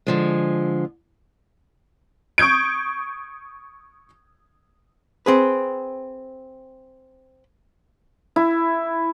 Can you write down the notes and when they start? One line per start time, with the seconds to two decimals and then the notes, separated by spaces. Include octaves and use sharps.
0.07 D3 F3 G#3
2.38 C#6 D#6 G6 G#6 D7
5.26 C4 G#4 B4
8.36 E4